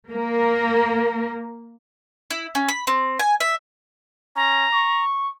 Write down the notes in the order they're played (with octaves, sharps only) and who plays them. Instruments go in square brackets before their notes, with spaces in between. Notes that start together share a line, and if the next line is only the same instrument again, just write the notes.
[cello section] A#3 A#4
[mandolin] E4
C#4
B5
C4
G#5
E5
[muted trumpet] C#4 [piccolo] A#5
[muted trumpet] C#6